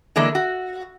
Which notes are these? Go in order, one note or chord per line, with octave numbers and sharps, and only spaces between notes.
D3 E3 G#3 A#3 D4
F#4